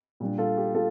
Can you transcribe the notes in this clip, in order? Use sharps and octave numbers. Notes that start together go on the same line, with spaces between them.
A#2 G3 D4
F4 A4
G4
F4 A4